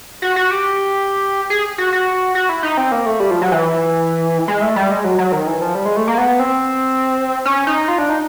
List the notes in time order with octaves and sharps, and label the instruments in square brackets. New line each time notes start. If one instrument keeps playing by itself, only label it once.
[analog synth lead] F#4
F#4
G4
G#4
F#4
F#4
F#4
E4
D#4
C4
A#3
A3
G3
F3
F#3
E3
G#3
A3
G3
G#3
F#3
F#3
D#3
E3
F3
G3
G#3
A3
A#3
B3
C4
C#4
D#4
F4
D4
D#4